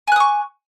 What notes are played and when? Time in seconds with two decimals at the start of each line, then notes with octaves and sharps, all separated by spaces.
0.07 G#5
0.12 F#6
0.16 D#6
0.20 C#6